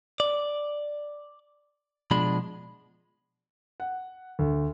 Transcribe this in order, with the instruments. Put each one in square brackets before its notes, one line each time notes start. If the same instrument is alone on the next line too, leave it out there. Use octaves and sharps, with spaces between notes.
[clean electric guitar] D5
B2 F3 G#3 D4 B5
[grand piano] F#5
D2